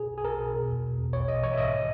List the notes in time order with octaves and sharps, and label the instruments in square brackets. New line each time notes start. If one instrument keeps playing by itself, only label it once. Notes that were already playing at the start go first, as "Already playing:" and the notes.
Already playing: [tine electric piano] B2 G#4
B1
G#4
B1 A#4
B2
B2
E2
E2
B2
A#1 C#5
A#1 D#5
E3 C#5
E5
G#2 D#5
D#3